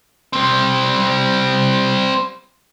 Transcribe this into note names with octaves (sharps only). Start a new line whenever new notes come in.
G3 C4